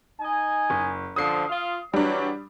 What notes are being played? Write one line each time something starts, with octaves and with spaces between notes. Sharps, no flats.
D#4 D#5 G#5
F#1
D3 F3 D#6 C7
F4 F5
E3 F#3 G3 D4